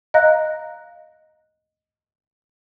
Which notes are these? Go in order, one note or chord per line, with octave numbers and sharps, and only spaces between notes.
D#5 F5 A#5 F#6 A#6